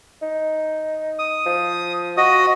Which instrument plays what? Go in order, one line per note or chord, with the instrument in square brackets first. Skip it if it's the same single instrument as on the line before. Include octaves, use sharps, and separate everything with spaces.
[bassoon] D#4
[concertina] D#6
[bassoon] F3
[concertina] F#4 D#5 D#6